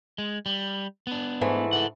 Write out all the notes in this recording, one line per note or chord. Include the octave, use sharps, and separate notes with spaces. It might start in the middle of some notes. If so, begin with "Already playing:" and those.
G#3
G3
B3 D4
G#2 E3 A3
A4 F#5